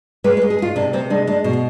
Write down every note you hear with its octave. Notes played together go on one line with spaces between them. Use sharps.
G#3 B4
B4
G#3
G#4
G#3 F4
C3 D4
C3 C4
G#3 D4
G#3 D4
B2
B3